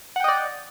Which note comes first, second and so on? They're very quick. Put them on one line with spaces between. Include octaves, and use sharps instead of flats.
F#5 G5 D#5 D5